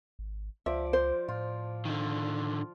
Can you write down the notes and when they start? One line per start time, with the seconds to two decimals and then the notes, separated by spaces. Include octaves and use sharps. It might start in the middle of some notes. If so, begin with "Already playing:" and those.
0.19 G#1
0.66 C#2 F3 D5 E5
0.93 C5
1.28 A2 F4
1.85 D3 D#3